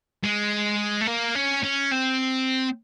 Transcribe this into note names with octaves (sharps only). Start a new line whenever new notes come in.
G#3
A3
A#3
C#4
C#4
C4